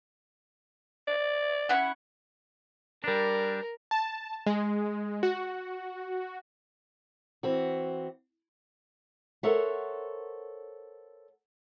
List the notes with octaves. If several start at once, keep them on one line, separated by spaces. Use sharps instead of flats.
D5
C#4 E4 F#5
G3 D4 A#4
A5
G#3
F#4
E3 C4 F#4
A4 A#4 C5 C#5 E5 F#5